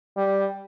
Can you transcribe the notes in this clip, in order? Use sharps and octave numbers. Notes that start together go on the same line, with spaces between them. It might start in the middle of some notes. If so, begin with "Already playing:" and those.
G3